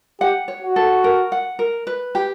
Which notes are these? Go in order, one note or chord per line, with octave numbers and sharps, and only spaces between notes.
G4 F#5
C#5
F#4
A4
A#4
F#5
A#4
B4
G4